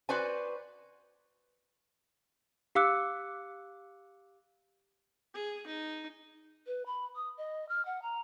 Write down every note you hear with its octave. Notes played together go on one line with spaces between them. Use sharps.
F#4 B4 C5 D5 G#5
G4 F5 D6 E6 F#6 C#7
G#4
D#4
B4
B5
D#6
D#5
F6
F#5
A#5